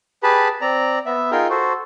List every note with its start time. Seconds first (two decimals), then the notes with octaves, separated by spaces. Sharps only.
0.23 G4 G#4 B4 A5 B5
0.61 C4 D5 A#5
1.06 B3 E5
1.32 D#4 F4 G#4 A#4 G5
1.50 F#4 A4 C5